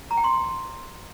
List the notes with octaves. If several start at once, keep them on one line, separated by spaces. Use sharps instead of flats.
A#5
G5
C6